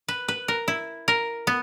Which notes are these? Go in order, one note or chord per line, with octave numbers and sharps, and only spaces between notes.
B4
B4
A#4
E4
A#4
B3